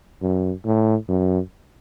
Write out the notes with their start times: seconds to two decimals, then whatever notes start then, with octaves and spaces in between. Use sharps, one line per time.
0.22 F#2
0.65 A2
1.09 F#2